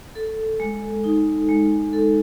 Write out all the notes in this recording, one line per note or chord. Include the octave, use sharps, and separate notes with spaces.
A4
G#3
D#4
G#3
A4